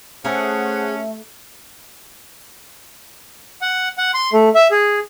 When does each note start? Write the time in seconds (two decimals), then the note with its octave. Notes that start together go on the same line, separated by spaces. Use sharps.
0.25 A3 C#4 G#4 C5 F#5
3.62 F#5
3.98 F#5
4.14 C6
4.33 A3
4.55 E5
4.71 G#4